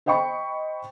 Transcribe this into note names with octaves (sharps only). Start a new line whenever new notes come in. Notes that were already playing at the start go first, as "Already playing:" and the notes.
C5 D#5 G5 B5 C#6